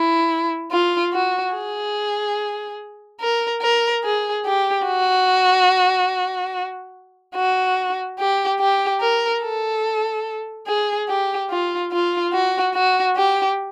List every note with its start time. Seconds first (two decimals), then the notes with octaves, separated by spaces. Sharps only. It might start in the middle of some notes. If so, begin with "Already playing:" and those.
Already playing: E4
0.72 F4
1.13 F#4
1.54 G#4
3.20 A#4
3.61 A#4
4.04 G#4
4.45 G4
4.86 F#4
7.36 F#4
8.19 G4
8.60 G4
9.01 A#4
9.43 A4
10.67 G#4
11.08 G4
11.50 F4
11.92 F4
12.33 F#4
12.74 F#4
13.16 G4